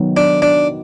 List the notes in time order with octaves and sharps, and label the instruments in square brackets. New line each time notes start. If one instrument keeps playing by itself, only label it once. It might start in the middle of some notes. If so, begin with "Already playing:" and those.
Already playing: [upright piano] D#3 F#3 B3
[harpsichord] D4
D4